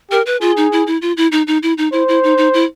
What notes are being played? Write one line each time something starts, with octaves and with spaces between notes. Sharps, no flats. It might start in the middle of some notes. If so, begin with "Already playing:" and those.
G4 A#4
B4
F4 G#4
D#4
E4
E4
F4
E4
D#4
D#4
E4
D#4
E4 C5
E4
D#4
D#4
E4